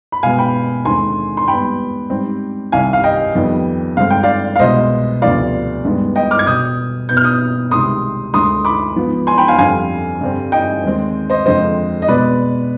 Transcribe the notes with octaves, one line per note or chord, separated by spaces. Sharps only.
B5
B2 G#3 B3 F5 G#5
G5 B5
D#2 D3 G#3 C4 G#5 C6
C6
G#2 G3 B3 G5 B5
G#2 G3 C4
C2 C3 D#3 G3 F5 G#5
F5
D#5 G5
F2 D#3 G3 B3
G2 D3 G#3 C4 F5
G5
D5 F5
F5
C2 B2 G#3 B3 C5 D#5
D2 C3 F3 B3 D5 F5
G2 D#3 G#3 B3
D#5 G5
D6 F6
G#6
B2 B3 D#6 G6
B2 B3 G6
F6
D#6 G6
C2 C3 D#3 G#3 C6 D#6
D2 D3 G#3 C6 D#6
B5 D6
G#2 F3 B3
G#5 C6
G5 B5
F5 G#5
F2 D3 G3 C4 F5 G#5
G2 D3 G3 C4
D#5 G5
D#2 D#3 G#3 C4
C5 D#5
F2 D3 G#3 C4 C5 D#5
D#5
B2 G#3 B3 B4 D5